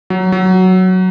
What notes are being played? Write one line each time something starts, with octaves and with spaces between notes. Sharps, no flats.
F#3
F#3